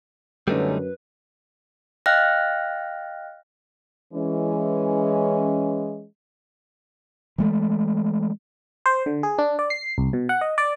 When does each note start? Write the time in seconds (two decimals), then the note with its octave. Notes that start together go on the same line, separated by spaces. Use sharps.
0.48 F#2 D3 F#3 G3 A3 C#4 D#4 B4
2.06 D#5 F5 G5 F6 F#6 A#6
4.14 E3 G#3 C#4
7.38 E3 G#3 A3
8.86 C5
9.06 D3
9.23 G#4
9.38 D4
9.59 D5
9.70 C7
9.98 C2
10.13 B2
10.29 F#5
10.41 D#5
10.58 D5